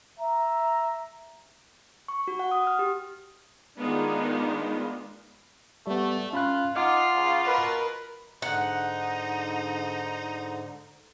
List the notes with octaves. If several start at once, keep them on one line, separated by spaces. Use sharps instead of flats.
E5 A#5
C#6
F#4
F#5
D#6
F6
G4
D#3 G#3 B3 D4 D#4 F4
G3 A3 B3
C#4 F4 B5 F#6
D#4 F4 F#5 D6 F6
C#3
B2 A#4 B4
G#2 D3 D#4 F#5